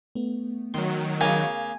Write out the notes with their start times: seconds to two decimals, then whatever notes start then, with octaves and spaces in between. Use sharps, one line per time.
0.15 A3 B3
0.74 D#3 F#3 C6
1.21 C#3 A#3 G#5